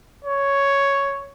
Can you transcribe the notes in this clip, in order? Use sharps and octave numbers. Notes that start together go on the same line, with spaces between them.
C#5